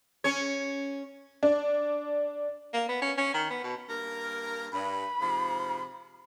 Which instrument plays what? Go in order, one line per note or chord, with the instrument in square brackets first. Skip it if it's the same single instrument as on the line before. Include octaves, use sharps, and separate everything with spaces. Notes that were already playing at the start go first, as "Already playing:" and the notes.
[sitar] C#4 C#5
[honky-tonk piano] D4
[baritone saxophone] A#3
B3
C#4
C#4
D#3
B3
B2
[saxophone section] G2 A#3 A#4
[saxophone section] G2 [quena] B5
[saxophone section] G#2 C3 F3